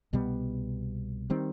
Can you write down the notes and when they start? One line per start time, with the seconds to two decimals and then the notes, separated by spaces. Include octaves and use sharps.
0.13 C2 B2 G3 B3
1.30 D#3 G3 C4